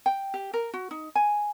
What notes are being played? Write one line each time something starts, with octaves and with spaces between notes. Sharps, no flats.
G5
G4
A#4
F#4
D#4
G#5